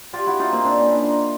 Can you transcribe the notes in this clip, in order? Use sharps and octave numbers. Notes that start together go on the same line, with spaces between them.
F4 G4
E4 F#4
D#4 F4
A#3 C4
C4 D4
C#4 D#4
D4 E4
D#4 F4